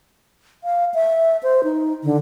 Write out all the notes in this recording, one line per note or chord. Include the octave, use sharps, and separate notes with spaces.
F5
E5
C5
D#4
D3